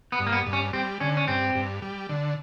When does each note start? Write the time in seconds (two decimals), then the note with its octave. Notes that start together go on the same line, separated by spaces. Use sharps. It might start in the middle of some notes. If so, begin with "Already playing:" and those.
0.12 B3
0.19 G2
0.27 A#3
0.32 B3
0.46 G2
0.53 C#4
0.73 G3 C4
1.00 D3 C#4
1.17 C#4
1.28 G2 C4
1.55 G2
1.82 G3
2.09 D3